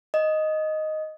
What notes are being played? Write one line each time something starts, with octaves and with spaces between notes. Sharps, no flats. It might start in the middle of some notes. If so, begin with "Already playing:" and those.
D#5